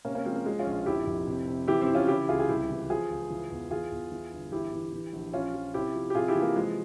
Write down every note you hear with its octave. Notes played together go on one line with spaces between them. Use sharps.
C3 A#3 C#4
A#3 C#4
F3 G#3 C4
A#3
F3 G#3
C#4 F4
A#1
F1 E4 G4
F1
C3
C3
E3 E4 G4
C4 E4
E3
C#4 F4
C#3 E4 G4
C#2 F4 G#4
G#4
C2 E4 G4
E3
F3 F4 G#4
C#2
E3
E2
E3 F4 G#4
E2
E3
G1
E3 E4 G4
E3
E3
A#1
A#1 C#4 F4
F3
C3 E4 G4
F3
G4
C3 F4 G#4
E4 G4
E3
A#3
F3 G#3